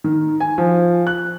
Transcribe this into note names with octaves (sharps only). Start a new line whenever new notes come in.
D#3
G#5
F3
F#6